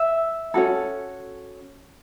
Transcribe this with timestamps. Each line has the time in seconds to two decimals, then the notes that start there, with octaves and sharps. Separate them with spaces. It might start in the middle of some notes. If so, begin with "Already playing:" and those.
Already playing: E5
0.54 C#4 F#4 A4